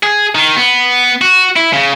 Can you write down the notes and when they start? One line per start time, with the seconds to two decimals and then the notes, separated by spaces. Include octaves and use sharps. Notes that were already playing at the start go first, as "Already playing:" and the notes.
0.03 G#4
0.35 D#3
0.56 B3
1.21 F#4
1.56 E4
1.73 C#3